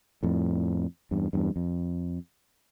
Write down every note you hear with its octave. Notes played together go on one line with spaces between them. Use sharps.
F2 A2
E2 G2
E2 G2
F2